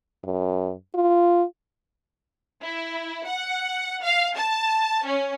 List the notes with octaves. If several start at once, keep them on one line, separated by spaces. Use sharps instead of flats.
F#2
F4
E4
F#5
F5
A5
C#4